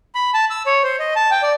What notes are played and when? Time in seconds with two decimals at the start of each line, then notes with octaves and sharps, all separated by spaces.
0.15 B5
0.34 A5
0.50 E6
0.66 C#5
0.83 C5
0.99 D#5
1.16 A5
1.31 G5
1.43 D5